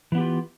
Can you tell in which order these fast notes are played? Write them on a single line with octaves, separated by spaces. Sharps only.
E3 B3 G4 F4